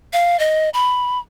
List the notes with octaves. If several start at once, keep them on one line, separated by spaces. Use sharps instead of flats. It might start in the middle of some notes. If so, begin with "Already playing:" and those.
F5
D#5
B5